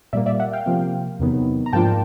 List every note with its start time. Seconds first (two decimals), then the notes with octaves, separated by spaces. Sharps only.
0.13 A#2 G3 A#3 D5 E5
0.26 D5 E5
0.39 E5 F#5
0.53 F5 G5
0.66 C3 F3 A#3
1.19 E2 C3 D#3 F#3 B3
1.66 A#5
1.73 G#2 F3 A#3 D4 F4 G5 A5